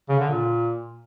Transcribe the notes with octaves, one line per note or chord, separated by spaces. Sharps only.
C#3
D3
A#2